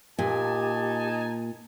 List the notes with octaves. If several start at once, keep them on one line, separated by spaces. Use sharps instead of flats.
A#2 D#4 G4 G#5 A5